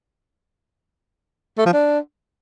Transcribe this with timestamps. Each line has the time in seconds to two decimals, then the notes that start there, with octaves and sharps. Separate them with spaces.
1.58 A3
1.65 F3
1.73 D4